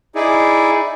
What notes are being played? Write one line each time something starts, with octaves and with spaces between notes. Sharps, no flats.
D#4 E4 G#4 D5